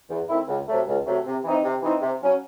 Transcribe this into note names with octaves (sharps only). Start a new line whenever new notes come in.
E2
D#3 A3 C4 E4
C#2
C3 F#3 A3
C#2
C3 F#3 A3
C3
E3 C4 D#4
C3
E3 C4 D#4
C3
F#3 C#4